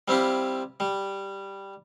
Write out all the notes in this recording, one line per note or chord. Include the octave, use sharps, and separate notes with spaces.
G3 C4 E4 F4 G4
G3